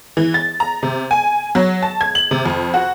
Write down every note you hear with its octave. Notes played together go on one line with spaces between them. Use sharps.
E3
A6
A#5
C3
G#5
F#3
A5
G#6
F#7
C3
F2
F#4